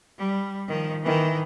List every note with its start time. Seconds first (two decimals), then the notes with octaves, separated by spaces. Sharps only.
0.18 G3
0.68 D#3 F3
1.03 D#3 E3